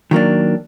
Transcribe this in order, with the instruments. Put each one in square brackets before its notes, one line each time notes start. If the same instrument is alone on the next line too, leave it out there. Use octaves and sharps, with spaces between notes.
[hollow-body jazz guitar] D#3 F#3 A#3 D4